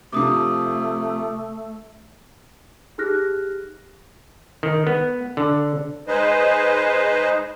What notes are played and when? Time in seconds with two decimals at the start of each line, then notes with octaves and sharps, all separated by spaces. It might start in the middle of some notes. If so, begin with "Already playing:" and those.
0.13 C3 F3 A3 D6 D#6
2.98 D#4 G4 G#4 F6 F#6 A#6
4.63 D#3
4.87 B3
5.37 D3
6.08 G#3 D#4 G#4 B4 C5 D#5